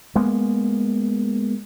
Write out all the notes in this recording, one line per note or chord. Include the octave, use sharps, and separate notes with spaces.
G#3 A#3 B3